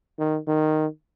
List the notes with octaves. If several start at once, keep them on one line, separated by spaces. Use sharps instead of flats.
D#3
D#3